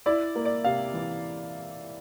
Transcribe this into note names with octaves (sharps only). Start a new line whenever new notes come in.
E4 D5
A#3
D5
C3 F5
E3